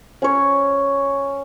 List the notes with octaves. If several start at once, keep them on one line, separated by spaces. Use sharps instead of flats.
C#4 C#5